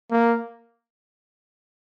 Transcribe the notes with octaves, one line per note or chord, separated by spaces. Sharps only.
A#3